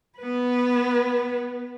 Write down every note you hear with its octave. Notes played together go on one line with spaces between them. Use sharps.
B3 B4